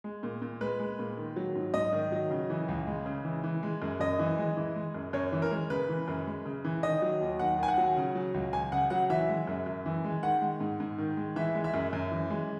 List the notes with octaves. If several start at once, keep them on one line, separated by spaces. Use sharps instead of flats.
G#3
A#2
A#2
G#3 B4
G#3
A#2
D#3
F#3
G#2
G#2 D#5
D#3
F#3
C#3
E3
C#2
G#3
C#3
E3
E3
G#3
F#2
F#2 D#5
E3
G#3
E3
G#3
F#2
F#2 C#5
E3
A#4
G#3
C#3 B4
E3
F#2
G#3
C#3
E3
D#3 D#5
F#3
D#2
D#2 F#5
D#3 G#5
F#5
F#3
C#3
F#3
C#2
C#2 G#5
C#3 F#5
F#3 F#5
E3 E5
G#3
F#2
F#2
E3
G#3
D#3 F#5
G#3
G#2
G#2
D#3
G#3
E3 E5
G#3
E5
F#2
F#2
E3
G#3